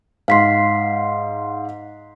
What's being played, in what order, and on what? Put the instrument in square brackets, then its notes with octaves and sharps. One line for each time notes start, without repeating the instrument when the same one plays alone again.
[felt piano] G#2 C6 [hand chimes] F5 B6 C7